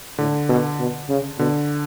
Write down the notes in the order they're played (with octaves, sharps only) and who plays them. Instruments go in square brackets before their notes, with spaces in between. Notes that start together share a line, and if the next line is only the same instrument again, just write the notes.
[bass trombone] A2 [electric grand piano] D3
[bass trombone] B2
B2
C#3
[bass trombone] B2 [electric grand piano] D3